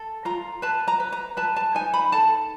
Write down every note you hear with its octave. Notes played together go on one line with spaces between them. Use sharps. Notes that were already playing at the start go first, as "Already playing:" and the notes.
Already playing: A4
F4 A#5
B4 A5
A#5
B4
A#5
B4 A5
A5
D#4 G#5
B5
A4 A5